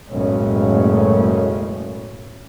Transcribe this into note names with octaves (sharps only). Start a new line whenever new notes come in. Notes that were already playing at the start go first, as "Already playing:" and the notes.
F#1 B1 A2 C#3 G#3 C#4